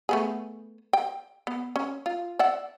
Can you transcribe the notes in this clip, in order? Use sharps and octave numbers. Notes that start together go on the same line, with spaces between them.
A3 B3 G#4
G5
B3
C#4
F4
D5 E5 F#5